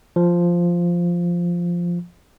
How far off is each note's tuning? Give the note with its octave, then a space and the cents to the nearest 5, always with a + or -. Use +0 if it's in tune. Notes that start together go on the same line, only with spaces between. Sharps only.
F3 -5